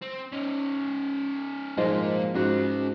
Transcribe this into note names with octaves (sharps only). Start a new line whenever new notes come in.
C4
C#4 D#4
G#2 F3 G#3 A#3 F4
G#2 C#4 F#4 D#5